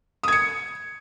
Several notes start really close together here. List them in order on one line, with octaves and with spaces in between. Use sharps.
D#6 G#6 C#7